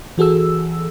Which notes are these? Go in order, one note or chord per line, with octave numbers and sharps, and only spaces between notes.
E3 F#4 G#4 A4 E6